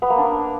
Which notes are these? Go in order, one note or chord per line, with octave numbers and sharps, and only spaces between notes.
B3
A#3
D4